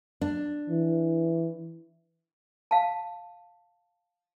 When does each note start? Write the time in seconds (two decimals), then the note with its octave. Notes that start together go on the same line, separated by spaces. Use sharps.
0.21 D4
0.70 E3
2.71 F5 A5